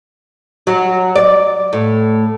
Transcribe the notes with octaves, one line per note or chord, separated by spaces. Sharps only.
F#3
D5
A2